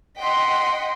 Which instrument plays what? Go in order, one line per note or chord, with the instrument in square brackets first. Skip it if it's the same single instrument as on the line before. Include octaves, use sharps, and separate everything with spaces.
[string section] D#5 F#5 G5 C6 B6